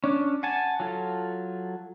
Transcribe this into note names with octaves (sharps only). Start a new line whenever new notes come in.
C#4 D4
F#5 G#5 A5
F#3 F4 A4